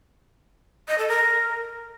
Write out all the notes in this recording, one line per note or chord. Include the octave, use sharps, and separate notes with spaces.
D#5
A4
A#4